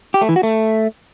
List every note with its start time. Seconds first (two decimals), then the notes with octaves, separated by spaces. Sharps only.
0.14 G4
0.21 A3
0.29 E3
0.36 F#4
0.43 A3